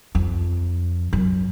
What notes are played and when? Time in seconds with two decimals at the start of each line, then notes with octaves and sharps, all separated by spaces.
0.15 F2
1.13 F#2